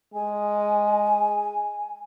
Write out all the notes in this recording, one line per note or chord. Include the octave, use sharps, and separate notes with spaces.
G#3 G#5